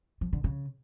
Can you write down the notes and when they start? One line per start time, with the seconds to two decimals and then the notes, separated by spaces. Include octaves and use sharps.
0.21 F3
0.33 D3
0.44 C#3